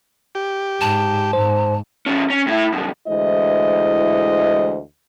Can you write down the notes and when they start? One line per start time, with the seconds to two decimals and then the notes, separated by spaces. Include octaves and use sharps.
0.35 G4
0.81 G#2 A5
1.33 G#2 C5
2.06 E2 C#4
2.30 C#4
2.47 A2 E4
2.72 C2 F#2
3.08 D2 E3 G#3 E4 C5 D#5